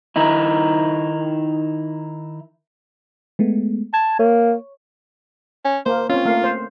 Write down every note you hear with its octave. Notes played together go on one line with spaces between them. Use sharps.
D#3 D#4 E4
G#3 A3 B3
A5 G#6
A#3 C#5
C#4
A#3 C5
C4 C#4 F4
A3 A#3 F5
C5